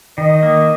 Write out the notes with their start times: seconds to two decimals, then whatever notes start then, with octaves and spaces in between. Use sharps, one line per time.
0.18 D#3 D#5
0.43 A#3